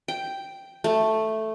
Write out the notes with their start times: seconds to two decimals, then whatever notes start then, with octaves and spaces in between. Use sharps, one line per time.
0.08 G5
0.84 A3